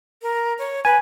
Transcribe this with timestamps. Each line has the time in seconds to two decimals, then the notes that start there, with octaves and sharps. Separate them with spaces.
0.22 A#4
0.59 C#5
0.85 B4 G#5